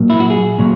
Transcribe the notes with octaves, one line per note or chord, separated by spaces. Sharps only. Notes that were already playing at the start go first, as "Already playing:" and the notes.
Already playing: A#2 F#3 A#3
E4
F#4
G#4
A#2 F#3